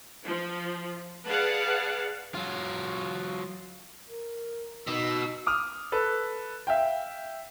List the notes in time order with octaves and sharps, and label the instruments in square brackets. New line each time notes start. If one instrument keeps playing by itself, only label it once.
[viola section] F3
G#4 B4 D5 F5 F#5 A5
[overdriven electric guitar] F#3 F4
[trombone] A#4
[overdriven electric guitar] B2 [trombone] D#4 [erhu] E6
[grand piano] D6 D#6 F6
A4 B4
E5 F5 G5